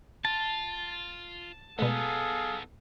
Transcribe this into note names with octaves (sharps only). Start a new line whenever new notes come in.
F4 A5
B2 G#3 A3 B3 D#4 G#4 A4 F5